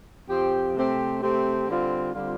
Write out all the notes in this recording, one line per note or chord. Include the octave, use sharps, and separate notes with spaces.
F2 F3 C4 G4
C3 A3 C4 G4
C3 A3 C4 G4
D3 G3 C4 F4
D3 G3 C4 F4